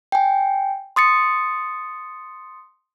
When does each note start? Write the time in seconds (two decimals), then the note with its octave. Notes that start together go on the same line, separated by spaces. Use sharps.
0.12 G5 G#5
0.96 C6 D#6 A6 C#7